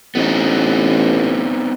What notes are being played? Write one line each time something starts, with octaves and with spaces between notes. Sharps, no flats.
A1 B3 C4 D#4